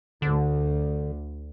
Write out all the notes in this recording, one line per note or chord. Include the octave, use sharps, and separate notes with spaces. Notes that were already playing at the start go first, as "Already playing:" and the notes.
D2 D3